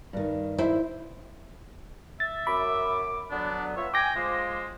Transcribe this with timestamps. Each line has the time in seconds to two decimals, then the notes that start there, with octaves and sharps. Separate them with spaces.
0.13 G2 D#3
0.58 E4 C5 E5
2.20 E5 A6
2.47 F#2 B5 D6
3.31 D3 F#3 B3 D4
3.76 B3 F4 C#5 E5
3.94 G5 G#5 D6 A#6
4.16 G#3 F4 C5